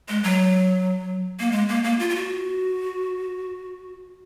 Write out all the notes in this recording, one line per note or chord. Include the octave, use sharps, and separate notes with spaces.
G#3
F#3
A#3
G#3
A#3
A#3
F4
F4
F#4